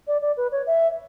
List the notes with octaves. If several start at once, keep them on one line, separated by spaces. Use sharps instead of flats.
D5
D5
B4
C#5
E5